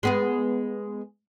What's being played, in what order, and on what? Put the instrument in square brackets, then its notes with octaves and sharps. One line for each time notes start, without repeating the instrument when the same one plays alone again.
[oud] G#3 B3 G#4